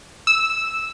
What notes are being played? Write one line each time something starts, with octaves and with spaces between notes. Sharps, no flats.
E6